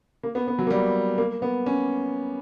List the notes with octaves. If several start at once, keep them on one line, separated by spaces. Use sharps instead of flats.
A#3
B3
B3
F#3
A#3
G3
A#3
B3
C#4